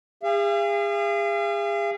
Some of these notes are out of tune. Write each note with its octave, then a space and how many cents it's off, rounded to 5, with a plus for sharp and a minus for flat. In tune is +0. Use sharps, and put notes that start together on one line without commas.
G#4 -35 F5 -40